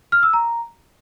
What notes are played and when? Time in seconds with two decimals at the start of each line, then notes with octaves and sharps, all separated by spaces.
0.12 F6
0.23 E6
0.33 A#5